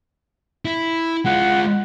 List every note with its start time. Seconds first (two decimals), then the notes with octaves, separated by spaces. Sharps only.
0.65 E4
1.26 G#3 F4 F#5